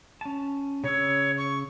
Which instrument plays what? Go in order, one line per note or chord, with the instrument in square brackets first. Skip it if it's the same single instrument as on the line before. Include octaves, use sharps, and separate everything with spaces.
[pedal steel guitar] C#4 A5
[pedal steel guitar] C#3 E6 [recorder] C#5
[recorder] C#6